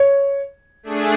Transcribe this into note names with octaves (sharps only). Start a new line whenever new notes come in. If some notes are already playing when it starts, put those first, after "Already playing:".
Already playing: C#5
A3 D4 G#4